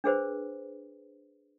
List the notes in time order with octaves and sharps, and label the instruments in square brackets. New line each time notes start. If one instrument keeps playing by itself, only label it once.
[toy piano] D4 G#4 B4 C5